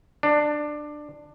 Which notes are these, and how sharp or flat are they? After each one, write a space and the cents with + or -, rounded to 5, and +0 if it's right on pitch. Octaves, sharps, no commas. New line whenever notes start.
D4 +15